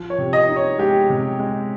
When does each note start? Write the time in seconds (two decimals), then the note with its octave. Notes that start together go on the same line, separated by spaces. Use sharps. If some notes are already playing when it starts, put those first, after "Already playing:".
Already playing: F3
0.10 C#5
0.18 C3
0.33 D#5
0.48 D#4
0.56 C#5
0.79 G#3 G4
1.10 C3
1.39 G#3